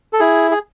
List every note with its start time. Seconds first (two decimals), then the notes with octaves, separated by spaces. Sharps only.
0.13 A4
0.19 E4 G#4
0.51 G#4